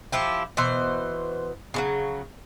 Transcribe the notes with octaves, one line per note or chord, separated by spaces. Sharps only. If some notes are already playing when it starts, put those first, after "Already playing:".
F3 E4 G4
B2 E3 C5
C#3 E3 F#3